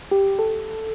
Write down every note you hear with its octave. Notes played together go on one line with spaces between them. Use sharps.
G4
A4